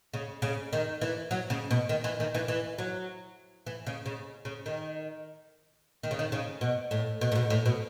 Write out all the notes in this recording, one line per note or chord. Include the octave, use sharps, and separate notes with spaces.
C#3
C#3
D#3
E3
F#3
C#3
B2
D#3
E3
D#3
E3
E3
F#3
E3
C#3
C#3
C#3
D#3
D#3
C#3
D#3
C#3
B2
A2
B2
A2
B2
A2
B2